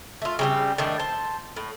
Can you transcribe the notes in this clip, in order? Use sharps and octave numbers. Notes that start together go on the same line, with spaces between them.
A3 F4
C#3 G3 C4
A2 D#3 D4
C5 A5
A2